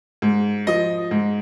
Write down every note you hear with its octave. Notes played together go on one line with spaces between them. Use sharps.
G#2
F3 D#5
G#2